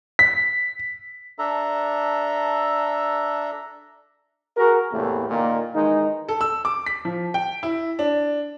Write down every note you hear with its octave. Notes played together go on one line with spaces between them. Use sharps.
B6
D4 A4 E5 A#5
F#4 G#4 A#4
E2 A2 C3 A3 A#3
A#2 D#3 A#3
D#3 E3 G#3 D#4
A4
E6
D6
B6
F3
G5
E4
D4